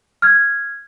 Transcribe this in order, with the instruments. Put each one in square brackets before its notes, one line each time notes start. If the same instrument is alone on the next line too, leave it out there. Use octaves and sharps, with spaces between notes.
[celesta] F6 G#6